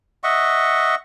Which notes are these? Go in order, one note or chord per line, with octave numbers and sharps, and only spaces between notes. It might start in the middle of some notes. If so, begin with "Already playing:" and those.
D#5 E5 F#5 C#6